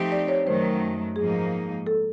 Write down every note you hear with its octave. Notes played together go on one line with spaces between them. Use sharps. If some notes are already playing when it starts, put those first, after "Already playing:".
Already playing: F3 A3 C4 D#4 G4
D5
C#5
F#2 D#3 F#3 A3 C5
G#2 F3 A#3 D#4 G#4
A4